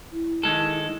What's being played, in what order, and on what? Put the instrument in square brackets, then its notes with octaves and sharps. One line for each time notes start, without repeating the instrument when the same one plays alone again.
[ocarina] E4
[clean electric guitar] D#3 G#3 A4